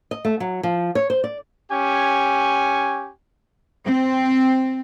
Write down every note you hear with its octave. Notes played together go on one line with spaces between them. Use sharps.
D#5
A3
F#3
F3
C#5
C5
D5
C#4 G4 G#5 C#6
C4